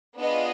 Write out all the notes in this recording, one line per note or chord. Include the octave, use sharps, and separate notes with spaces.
B3 D4 F4 G#4 D#5